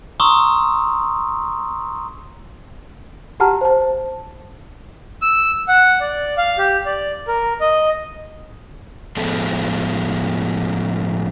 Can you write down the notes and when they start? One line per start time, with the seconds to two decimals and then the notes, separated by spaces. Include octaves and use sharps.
0.20 A#5 C6 C#6 D#6 E6
3.40 F#4 G4 F#5 A5 A#5 F6
3.61 C5 A5
5.22 E6
5.68 F#5
6.01 D5
6.38 F5
6.58 G4
6.86 D5
7.28 A#4
7.60 D#5
9.17 A2 F3 G#3 B3 A4